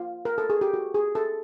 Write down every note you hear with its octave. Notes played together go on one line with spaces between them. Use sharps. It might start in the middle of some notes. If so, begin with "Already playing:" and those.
Already playing: F4
A#4
A4
G#4
G4
F#4
G#4
A4